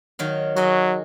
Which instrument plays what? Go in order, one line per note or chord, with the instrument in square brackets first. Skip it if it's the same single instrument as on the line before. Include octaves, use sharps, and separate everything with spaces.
[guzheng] D#3 F#3 F5
[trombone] F#3 [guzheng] F#4 G#4 D#5